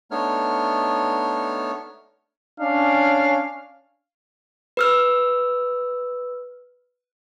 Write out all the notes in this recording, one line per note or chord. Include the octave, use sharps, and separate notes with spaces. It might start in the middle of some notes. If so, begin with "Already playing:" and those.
A3 B3 D4 D#4 C#5 F6
C#4 D4 F5
B4 E6 F6